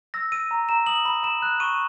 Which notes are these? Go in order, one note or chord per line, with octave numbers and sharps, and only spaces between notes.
E6 A#6
E6 D#7
A#5
A#5 E7
D#6 F#7
B5
B5 E7
F#6
C#6 D#7